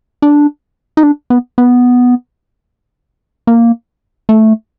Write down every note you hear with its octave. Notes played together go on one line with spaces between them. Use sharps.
D4
D#4
D4
B3
B3
A#3
A3